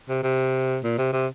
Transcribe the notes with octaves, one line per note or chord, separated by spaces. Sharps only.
C3
C3
A#2
C3
C3